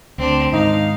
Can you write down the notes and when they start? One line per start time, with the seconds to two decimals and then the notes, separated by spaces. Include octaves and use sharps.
0.18 D2 C4 D4
0.53 G#2 D#3 D#4 F5